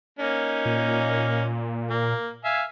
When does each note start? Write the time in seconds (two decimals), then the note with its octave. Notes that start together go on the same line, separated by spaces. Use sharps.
0.19 A#3 C#4 D#4
0.65 A#2
1.91 A#3
2.45 E5 F5 G#5